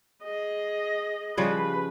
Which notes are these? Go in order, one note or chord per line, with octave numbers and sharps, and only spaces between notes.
G#4 D#5
C#3 F3 G3 B4